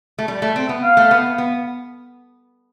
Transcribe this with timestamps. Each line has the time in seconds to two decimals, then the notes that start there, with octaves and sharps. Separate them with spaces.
0.19 A3
0.28 G3
0.42 A3
0.56 C4
0.69 B3
0.84 F5
0.97 A3
1.11 B3
1.38 B3